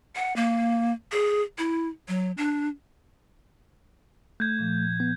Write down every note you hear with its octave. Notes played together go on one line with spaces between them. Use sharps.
F#5
A#3
G#4
E4
F#3
D4
A3 G6 G#6
A#2 F3
B3